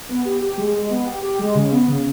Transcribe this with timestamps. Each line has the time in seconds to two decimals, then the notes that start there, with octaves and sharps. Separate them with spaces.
0.09 B3
0.25 G4
0.41 G4
0.58 G#3
0.74 G#3
0.90 B3
1.06 G4
1.23 G4
1.39 G#3
1.55 C#3
1.72 B3
1.88 C#3